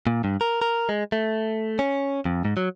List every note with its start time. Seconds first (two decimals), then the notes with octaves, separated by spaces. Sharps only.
0.07 A#2
0.24 G2
0.41 A#4
0.62 A#4
0.89 G#3
1.12 A3
1.79 C#4
2.25 F2
2.45 G#2
2.57 F#3